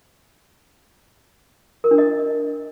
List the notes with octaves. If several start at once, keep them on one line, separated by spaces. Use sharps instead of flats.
A#4
D4
D#5